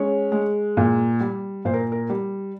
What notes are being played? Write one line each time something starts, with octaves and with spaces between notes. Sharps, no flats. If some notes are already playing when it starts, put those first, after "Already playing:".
Already playing: G#3 C#4 C#5
G#3
A#2
G3
A#2 C5
A#4
A#4
G3